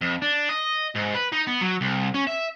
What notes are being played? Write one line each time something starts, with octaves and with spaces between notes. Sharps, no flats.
F2
D4
D#5
G#2
B4
D#4
B3
F#3
C2
C#4
E5